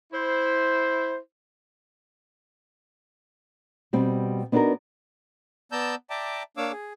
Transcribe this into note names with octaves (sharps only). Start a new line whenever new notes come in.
E4 C5
B2 G3 C4
B3 D4 D#4 F4 F#4 A#4
B3 D5 A5 A#5 E6 G6
D5 E5 G5 A5 A#5 D6
A#3 D4 C#5 F5 D6 E6
G#4